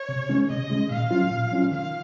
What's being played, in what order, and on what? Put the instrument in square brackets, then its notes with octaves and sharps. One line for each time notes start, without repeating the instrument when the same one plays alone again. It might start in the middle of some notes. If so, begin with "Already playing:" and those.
Already playing: [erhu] C#5
[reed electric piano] C3
D#3 G#3 C#4
[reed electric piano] C3 [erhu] D#5
[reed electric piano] D#3 G#3 C#4
[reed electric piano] A#2 [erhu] F5
[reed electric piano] F#3 C#4 F4
A#2
F#3 C#4 F4
[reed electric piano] D#3 [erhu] F5